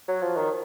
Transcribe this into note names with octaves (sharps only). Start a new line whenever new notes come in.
F#3
F3
D#3